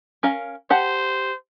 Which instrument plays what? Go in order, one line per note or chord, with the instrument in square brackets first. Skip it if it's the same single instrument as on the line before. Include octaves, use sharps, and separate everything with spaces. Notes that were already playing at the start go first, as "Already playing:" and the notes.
[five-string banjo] C#4 A#4 F5
[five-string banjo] G4 F#5 A5 [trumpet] C5